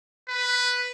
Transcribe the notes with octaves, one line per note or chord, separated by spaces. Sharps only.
B4